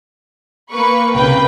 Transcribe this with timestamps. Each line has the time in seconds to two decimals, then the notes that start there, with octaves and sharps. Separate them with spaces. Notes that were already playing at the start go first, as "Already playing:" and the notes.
0.72 A#3 B4 C#6
1.14 C2 C#3 A#3 B4 G5